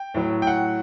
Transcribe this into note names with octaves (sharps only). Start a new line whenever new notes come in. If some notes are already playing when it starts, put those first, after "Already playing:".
Already playing: G5
A2 F#3
G5
F#5